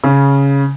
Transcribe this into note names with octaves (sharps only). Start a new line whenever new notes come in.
C#3